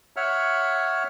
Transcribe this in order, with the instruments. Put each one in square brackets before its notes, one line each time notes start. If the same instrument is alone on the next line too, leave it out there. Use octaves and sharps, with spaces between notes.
[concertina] C#5 E5 F#5 F6